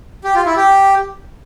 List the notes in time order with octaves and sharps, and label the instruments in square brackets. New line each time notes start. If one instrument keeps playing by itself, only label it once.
[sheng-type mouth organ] G4
F4
E4
G4